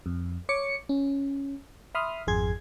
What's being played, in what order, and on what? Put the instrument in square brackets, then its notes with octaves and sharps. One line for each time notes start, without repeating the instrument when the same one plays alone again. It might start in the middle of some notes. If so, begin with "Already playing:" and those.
[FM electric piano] F2
C#5 D6 C#7
C#4
E5 B5 C6 D#6 F6
G#1 F2 G#4 C6 G#6